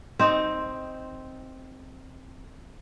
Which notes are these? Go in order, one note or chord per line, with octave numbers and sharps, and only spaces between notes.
C4 D#4